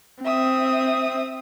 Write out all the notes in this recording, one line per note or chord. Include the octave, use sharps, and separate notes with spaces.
C4 E5 D#6